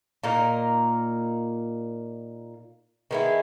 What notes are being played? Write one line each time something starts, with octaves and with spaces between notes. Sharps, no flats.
A#2 A#3 D#4 A#4
D#3 G#3 B3 E4